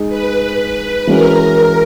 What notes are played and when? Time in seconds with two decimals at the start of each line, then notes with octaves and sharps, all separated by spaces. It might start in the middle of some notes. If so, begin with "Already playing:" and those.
Already playing: G#3 D#4
0.09 B4
1.07 E3 G#3 C#4 F#4 A#4